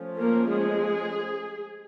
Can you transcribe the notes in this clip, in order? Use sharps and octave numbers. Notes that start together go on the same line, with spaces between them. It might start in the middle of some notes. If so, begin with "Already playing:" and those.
Already playing: F3 A3 C#4
A#3 A#4
G#3 G#4